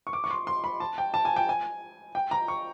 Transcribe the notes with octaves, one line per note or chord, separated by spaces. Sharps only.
C#6
D6
C#6
C6
C6
B5
A5
G5
A5
G#5
G5
G#5
G5
A#5
C#6